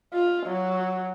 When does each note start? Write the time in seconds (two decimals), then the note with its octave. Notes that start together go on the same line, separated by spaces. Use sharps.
0.13 F4
0.46 F#3